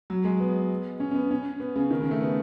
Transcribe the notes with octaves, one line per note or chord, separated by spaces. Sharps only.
F#3
G#3
B3
C#4
C#4
B3
C#4
B3
C#3
D#3
C#3
A3
B3